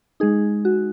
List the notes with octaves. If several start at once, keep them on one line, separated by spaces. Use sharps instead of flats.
G#3 D#4 G#4
F#4